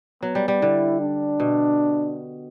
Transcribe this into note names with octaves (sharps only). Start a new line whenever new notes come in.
F#3 B3
G3
G3
D3 E4
D4
B2